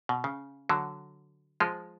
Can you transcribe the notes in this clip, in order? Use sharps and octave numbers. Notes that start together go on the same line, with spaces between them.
B2
C#3
D3 F#3
F3 G#3